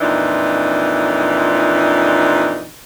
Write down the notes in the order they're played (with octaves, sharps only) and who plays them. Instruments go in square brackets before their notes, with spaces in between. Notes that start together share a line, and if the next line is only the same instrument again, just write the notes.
[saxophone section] F2 A#2 E3 D4 D#4